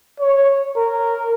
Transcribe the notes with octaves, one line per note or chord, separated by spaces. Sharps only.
C#5
A#4